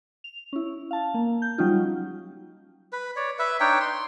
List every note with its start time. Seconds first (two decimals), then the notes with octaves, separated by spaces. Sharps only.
0.24 F7
0.53 C#4 E4
0.91 F5 A5
1.14 A#3
1.42 G6
1.58 F#3 G3 C#4 D#4 F4
2.93 B4
3.16 C#5 D5
3.39 B4 E5
3.60 D4 D#4 C#5 G5
3.80 C6